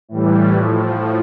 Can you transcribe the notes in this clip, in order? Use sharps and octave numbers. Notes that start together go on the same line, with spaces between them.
A2 E3 G3
A2 F3